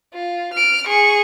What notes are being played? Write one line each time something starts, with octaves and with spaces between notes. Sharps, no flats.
F4
F6 D7
G#4 C#6